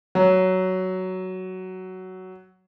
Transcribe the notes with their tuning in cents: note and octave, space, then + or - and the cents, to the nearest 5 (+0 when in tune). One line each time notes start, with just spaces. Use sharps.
F#3 +10